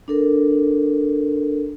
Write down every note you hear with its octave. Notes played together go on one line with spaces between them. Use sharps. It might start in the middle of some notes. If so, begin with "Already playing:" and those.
D4 A4 A#4